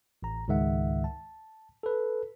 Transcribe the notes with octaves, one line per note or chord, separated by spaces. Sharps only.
A1 A#5
C#2 G#2 D#3 G#3 E5 F#5
A5
A4 B4